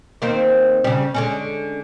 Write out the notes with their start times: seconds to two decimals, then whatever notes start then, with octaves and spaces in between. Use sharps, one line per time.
0.22 D#3 A#3 C4
0.84 C#3 G3
1.14 D3 G#3 C#4